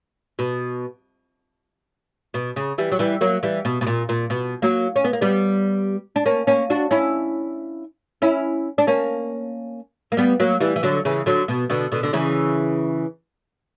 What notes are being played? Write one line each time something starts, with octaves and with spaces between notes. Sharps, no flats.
B2
B2
C#3
E3 G3
F#3
E3 G3
F#3 A#3
E3 G3
B2
B2
A#2
A#2
B2
F#3 A#3
C#4
B3
A#3
G3 B3
D4
A#3 C#4
A#3 C#4
D4 F#4
C#4 E4
C#4 E4
D4
A#3 C#4
A#3
G3 B3
F#3 A#3
E3 G3
E3
D3 F#3
C#3 E3
D3 F#3
B2
B2 D3
B2 D3
D3
C#3 E3